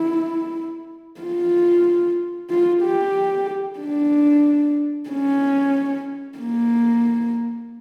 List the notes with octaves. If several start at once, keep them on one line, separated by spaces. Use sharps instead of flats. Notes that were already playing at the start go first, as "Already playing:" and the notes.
Already playing: E4
F4
F4
G4
D4
C#4
A#3